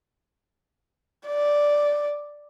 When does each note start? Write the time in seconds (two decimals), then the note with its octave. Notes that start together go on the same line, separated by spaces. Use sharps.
1.27 D5